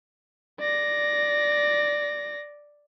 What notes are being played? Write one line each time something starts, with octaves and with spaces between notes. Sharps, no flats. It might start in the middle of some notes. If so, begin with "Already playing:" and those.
D5 A#6